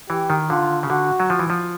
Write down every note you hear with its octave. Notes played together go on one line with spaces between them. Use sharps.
E3 G4
D#3
D3 F4
C#3
D3 F#4
F#3
F3
E3
F3